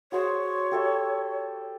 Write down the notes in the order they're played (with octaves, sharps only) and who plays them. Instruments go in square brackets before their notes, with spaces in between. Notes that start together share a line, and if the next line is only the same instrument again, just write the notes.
[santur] F#4 G#4 C5 [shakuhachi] C#5
[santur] G4 A4 E5